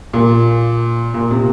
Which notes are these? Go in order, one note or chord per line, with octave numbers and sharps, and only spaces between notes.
A#2
A#2
C3